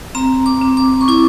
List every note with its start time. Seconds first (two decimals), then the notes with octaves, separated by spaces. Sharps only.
0.15 C4 A#5
0.46 D6
0.61 C4
0.77 D6
1.01 C#6
1.08 E4 D6